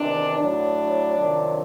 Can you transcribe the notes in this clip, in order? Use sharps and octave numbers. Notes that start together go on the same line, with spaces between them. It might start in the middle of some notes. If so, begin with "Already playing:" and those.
Already playing: E2 C3 D#3 D4
A2 F#3 D4
F2 C3 D#3 F#3